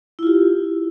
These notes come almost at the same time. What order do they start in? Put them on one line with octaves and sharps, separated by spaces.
E4 F4 G4